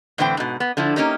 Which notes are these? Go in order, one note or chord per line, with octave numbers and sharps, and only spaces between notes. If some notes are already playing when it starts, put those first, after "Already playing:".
A2 D3 E3 C4 G5
G#2 B2
B3
D3 F3 E4
A#3 C#4 D#4 G4 A#4